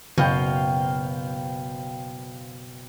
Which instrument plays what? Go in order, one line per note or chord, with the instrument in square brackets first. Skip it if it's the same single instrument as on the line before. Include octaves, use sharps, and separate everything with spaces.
[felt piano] F#1 [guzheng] B2 [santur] C5 F5 G5